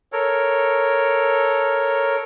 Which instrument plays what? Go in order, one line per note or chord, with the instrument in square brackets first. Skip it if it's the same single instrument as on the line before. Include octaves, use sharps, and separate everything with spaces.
[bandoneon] A4 A#4 C#5